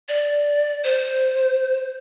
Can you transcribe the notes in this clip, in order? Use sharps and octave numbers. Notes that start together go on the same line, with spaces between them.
D5
C5